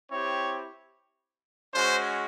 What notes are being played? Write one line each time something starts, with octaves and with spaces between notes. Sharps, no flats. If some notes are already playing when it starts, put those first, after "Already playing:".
C4 E4 G4 C#5
G#3 C#4 F#4 C5